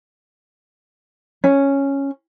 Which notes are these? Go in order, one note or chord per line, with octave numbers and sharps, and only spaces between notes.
C#4